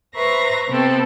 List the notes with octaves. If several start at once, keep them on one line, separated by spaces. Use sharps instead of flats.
B4 C5 E5 A#5 C#6 A#6
C3 B3 C4 A4